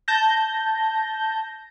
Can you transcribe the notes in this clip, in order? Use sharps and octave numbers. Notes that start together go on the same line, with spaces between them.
A5 G6 A#6